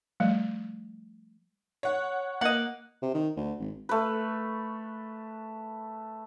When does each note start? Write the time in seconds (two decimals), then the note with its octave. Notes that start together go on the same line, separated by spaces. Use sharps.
0.20 F3 G3 A3
1.83 C#5 F#5
2.41 A#3 D#5 F#5
3.02 C3
3.14 D#3
3.37 D2
3.60 G#1
3.89 A3 B4